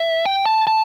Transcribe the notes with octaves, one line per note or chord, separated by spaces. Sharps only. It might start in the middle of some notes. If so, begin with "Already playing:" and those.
Already playing: E5
G5
A5
A5